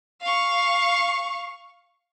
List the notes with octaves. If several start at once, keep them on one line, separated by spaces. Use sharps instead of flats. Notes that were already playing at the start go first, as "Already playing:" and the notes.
F5 C#6